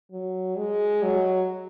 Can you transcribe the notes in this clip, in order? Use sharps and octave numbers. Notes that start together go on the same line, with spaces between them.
F#3
G#3
F#3